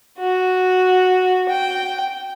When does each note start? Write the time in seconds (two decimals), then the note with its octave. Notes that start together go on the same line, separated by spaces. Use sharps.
0.18 F#4
1.48 G5